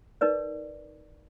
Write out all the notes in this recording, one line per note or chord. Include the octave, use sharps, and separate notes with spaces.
D#4 A#4 B4 D5